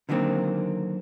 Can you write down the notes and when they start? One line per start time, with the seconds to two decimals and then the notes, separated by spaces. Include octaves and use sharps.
0.09 D3 D#3 F#3 A#3 C4